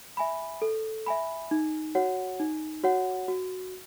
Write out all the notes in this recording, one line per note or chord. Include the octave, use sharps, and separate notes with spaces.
E5 G#5 B5
A4
E5 G#5 B5
D#4
F#4 C#5 F#5
D#4
F#4 C#5 F#5
F#4